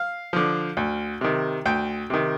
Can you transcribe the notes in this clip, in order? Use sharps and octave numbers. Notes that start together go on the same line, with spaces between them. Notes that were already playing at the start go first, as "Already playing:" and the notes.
Already playing: F5
D3 F3
D2
C3 D#3
D2 G5
C3 D#3